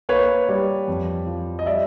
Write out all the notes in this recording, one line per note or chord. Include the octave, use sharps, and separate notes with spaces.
A#3 B4 C#5
G3
F2
F3
D#5
G3 D5 E5